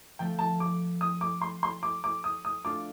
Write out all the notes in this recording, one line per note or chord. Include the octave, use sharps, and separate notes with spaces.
F3 A3 C4 G5
A5
D6
D#6
D6
C6
C6
D6
D6
D#6
D#6
A3 D4 F4 D6